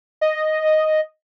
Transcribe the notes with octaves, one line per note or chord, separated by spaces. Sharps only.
D#5